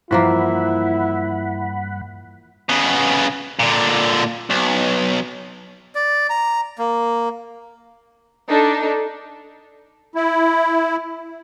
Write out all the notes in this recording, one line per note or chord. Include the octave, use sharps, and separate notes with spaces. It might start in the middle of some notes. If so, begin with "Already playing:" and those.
G2 E3 F3 A#3 E4 F#5 B5
C#3 B3
A#2 D3
B1
D5
A#5
A#3
D4 D#4 A4
E4